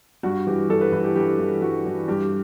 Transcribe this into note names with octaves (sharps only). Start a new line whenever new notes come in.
G2 F#4
E3 G4
G2 A4
B4
E3 B4
G4
G2 G4
E3
G2 F#4
E3
G2 G4